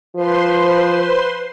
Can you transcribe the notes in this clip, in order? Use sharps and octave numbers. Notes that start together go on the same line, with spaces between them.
F3 B4 C5 C6